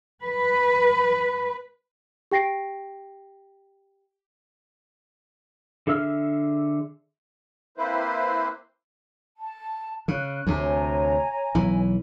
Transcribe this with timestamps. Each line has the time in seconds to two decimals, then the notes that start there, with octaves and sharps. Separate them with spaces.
0.24 B4
2.31 G4 G5 A#6 C7 D7
5.87 D3 G#4 E5 E6 F6
7.78 A#3 C4 E4 B4 C5
9.37 A5
10.08 C#3 F#6
10.47 D2 C3 C#5 G#5 A#5
11.55 B1 E3